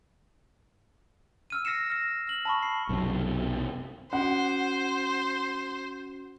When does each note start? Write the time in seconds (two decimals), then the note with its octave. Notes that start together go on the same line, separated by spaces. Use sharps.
1.50 E6 F6 D#7
1.65 E6 A#6 C7 C#7 E7
1.90 F6 A#6
2.27 F6 F#7
2.45 A5 B5 C#6
2.63 C7
2.89 B1 F#2 C3
4.13 C#4 F#4 C5 F#5